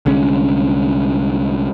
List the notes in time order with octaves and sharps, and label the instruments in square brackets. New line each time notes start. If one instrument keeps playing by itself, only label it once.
[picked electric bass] C2 D3 G#3 C#4